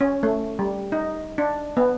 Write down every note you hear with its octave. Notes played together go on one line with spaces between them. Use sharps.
C#4
A3
G3
D#4
D4
B3